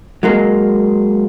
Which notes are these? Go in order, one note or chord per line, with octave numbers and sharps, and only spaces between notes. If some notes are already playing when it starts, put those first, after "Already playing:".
F#3 G#3 A#3